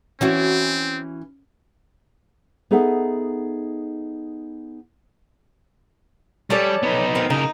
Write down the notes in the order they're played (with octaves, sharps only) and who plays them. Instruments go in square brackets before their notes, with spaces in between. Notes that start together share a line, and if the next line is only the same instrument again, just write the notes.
[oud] E3 E4 F#4 [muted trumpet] C4 [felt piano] C#4
[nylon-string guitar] B3 D#4 G#4 A4 E5 F#5
[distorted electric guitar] G3 [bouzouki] C#4 A4 D5
[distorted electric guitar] B3 D#4
[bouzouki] D#3 C4
[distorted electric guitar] C#3 A#4 [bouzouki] D#4